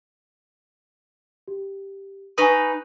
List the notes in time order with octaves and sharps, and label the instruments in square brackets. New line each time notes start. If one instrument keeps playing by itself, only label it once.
[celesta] G4
[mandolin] D#4 B4 [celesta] G#5 C#6 D#6